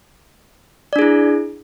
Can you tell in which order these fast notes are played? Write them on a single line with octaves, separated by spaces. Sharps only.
D5 D4 G#4 E4